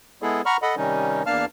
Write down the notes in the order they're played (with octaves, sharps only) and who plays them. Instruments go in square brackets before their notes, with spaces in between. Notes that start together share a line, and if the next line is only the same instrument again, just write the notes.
[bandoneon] G#3 B3 E4 G#4 A4
F#5 A#5 B5 C#6 F6
A4 D#5 F#5 B5
C3 D#3 G3 C#4 D#4
E2 A#3 D4 F5 A5 F6